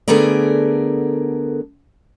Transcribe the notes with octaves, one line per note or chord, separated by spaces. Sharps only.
D3 A3 B3 G#4 A#4 D5